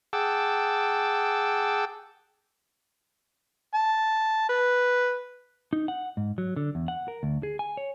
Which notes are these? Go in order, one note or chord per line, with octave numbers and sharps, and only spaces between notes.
G#4 F#5 G5 A5 D6 E6
A5
B4
D#4
F#5
G#2
F#3
D3
E2
F#5
A#4
D2
G#4
G#5
C#5